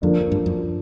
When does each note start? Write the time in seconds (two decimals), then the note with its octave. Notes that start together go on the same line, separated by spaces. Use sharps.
0.02 F2 D3 F3 A#3 D4
0.32 G2
0.46 F#2